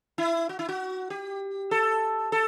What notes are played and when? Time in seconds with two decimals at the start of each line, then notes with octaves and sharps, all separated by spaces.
0.18 E4
0.49 F#4
0.59 E4
0.69 F#4
1.10 G4
1.71 A4
2.32 A4